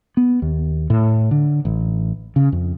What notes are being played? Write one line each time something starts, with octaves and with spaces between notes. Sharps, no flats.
B3
D#2
A2
D3
A1
C#3
F2